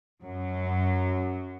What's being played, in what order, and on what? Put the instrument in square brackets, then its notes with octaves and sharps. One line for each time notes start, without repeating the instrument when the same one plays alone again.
[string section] F#2 F#3